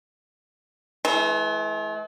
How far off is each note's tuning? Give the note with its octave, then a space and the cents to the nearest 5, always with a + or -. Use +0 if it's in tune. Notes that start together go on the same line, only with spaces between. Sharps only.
E3 +0 A3 -45